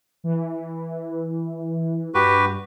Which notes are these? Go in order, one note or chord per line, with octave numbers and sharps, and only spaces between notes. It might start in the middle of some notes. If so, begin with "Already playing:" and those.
E3
G2 F#4 G4 B4